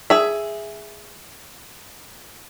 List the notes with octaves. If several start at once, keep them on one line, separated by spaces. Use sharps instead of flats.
G#4 E5